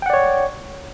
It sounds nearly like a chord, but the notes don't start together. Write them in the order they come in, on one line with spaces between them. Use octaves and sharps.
G5 F#5 D5 C#5